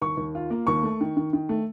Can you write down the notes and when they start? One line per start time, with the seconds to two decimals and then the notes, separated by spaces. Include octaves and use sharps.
0.02 D#2 C#6
0.17 D#2
0.35 F4
0.50 A#3
0.67 D#2 C#6
0.83 A3
1.01 D#3
1.17 D#3
1.33 D#3
1.49 A3